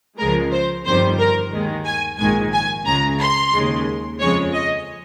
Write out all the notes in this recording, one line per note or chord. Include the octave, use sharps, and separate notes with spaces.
C#2 C#3 F3 G#3 A#4
C5
G1 F2 D#3 G3 C5
A#4
D#2 D#3 G#3
G#5
A#1 G#2 D#3 G#3 G#5
G#5
C#2 C#3 G#3 A#5
C6
D#2 C#3 G#3
F2 C#3 F3 G#3 C#5
D#5